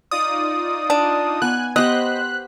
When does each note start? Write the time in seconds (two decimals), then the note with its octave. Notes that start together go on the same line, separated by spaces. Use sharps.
0.11 D#4 F4 D5 D#6
0.90 D4
1.42 B3 G#5 F#6
1.76 B3 G4 C5 D#5 F#6 B6